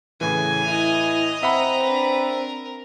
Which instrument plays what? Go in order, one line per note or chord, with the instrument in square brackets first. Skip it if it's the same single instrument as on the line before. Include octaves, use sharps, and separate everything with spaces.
[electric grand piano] A2 E3 [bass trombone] C#3 [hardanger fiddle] G#5
[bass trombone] E4 [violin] D#5 F7
[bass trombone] C4 [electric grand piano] E5 F#5 B5 [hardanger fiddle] A#5
[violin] D4 B4
A#4